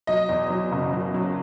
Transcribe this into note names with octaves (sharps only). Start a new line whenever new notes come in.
F#3 D#5
E2
F#3
F#1
F#3
F#3